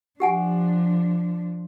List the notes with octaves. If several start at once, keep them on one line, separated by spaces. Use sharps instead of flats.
F3 D4 G4 F#5 G#5